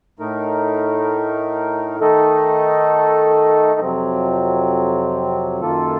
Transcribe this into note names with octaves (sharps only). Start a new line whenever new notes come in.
A2 A3 D#4 A#4
D#3 A3 D#4 A4 D#5
F2 C3 F#3 C4
F#2 D#3 A#3 F4 A4